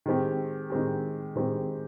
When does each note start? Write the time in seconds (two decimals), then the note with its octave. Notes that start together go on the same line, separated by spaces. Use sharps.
0.06 D#3 G#3 C4 G4
0.70 D#3 G#3 C4 G4
1.36 D#3 G#3 C4 G4